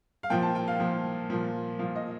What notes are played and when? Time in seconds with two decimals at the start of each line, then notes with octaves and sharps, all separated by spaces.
0.23 F5
0.30 A#2 F3 G5
0.42 A5
0.55 G5
0.68 F5
0.80 A#2 F3
1.30 A#2 F3
1.79 A#2 F3 F5
1.96 D#5